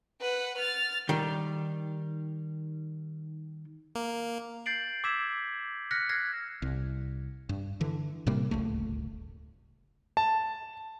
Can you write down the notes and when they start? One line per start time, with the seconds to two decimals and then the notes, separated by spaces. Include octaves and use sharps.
0.21 B4 F#5
0.58 F6 A6
1.09 D#3 G3
3.95 A#3
4.66 G6 A6 C7 D7 F#7
5.04 D6 E6 G#6 B6 E7
5.91 F6 F#6 A#6 B6 C#7
6.09 F6 G#6 A#6 C7
6.62 C2
7.49 G2
7.81 D3 E3
8.27 A2 C3 G3 A#3
8.51 D1 G1 C#2 A3
10.17 A5